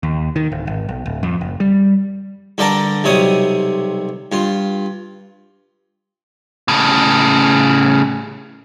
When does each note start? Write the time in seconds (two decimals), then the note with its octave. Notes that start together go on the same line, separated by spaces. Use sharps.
0.03 D#2
0.36 D#3
0.52 D1
0.67 G#1
0.88 B1
1.06 D1
1.23 F2
1.41 F#1
1.60 G3
2.58 G2 D3 A#4 D5 A5 A#5
3.04 B1 C3 G3 C#5 D#6
4.32 G2 F4
6.68 A2 C#3